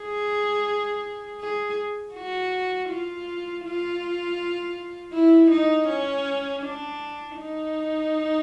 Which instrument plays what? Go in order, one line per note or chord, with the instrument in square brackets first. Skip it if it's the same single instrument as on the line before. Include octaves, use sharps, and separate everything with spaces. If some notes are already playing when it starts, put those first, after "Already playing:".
Already playing: [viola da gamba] G#4
G#4
F#4
F4
F4
E4
D#4
C#4
D4
D#4